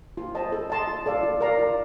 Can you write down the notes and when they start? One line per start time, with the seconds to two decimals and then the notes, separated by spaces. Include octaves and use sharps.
0.17 F4
0.35 C5 D#5 A5
0.52 A4
0.70 D#5 A5 C6
0.87 F4
1.06 A4 D5 F5
1.23 F4
1.41 A#4 D5 F5 A#5
1.59 F4